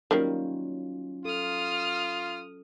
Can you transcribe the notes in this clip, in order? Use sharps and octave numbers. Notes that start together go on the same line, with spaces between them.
D#3 F#3 G3 A#3 C#4 F4
F4 A4 D#6 F6